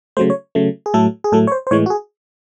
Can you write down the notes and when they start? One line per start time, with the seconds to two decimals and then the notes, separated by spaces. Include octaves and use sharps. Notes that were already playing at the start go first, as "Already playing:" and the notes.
0.17 C#3 F#3 A3 C5
0.30 C#5
0.55 C#3 F#3 A3
0.86 G#4
0.94 A2 F#3 A3 A4
1.24 G#4
1.32 A2 F#3 A3 A4
1.47 C#5
1.52 C5
1.67 C5
1.71 A2 E3 G#3 C#5
1.86 F#4
1.90 G#4